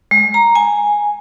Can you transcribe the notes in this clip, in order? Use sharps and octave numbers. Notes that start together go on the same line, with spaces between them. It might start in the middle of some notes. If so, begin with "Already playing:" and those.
G#3
A#5
G#5